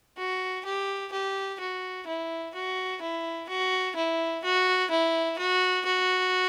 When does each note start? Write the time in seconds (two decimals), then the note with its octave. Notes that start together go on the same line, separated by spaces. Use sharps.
0.18 F#4
0.65 G4
1.12 G4
1.60 F#4
2.07 E4
2.54 F#4
3.02 E4
3.49 F#4
3.96 E4
4.44 F#4
4.90 E4
5.38 F#4
5.86 F#4